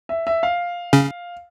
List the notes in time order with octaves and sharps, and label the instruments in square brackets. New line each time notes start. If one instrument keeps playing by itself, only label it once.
[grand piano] E5
E5
F5
[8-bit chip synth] C#3 C#4